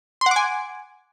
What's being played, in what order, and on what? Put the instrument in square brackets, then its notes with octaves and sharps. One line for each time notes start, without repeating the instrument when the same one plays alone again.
[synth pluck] C6
F#5
D6
G#5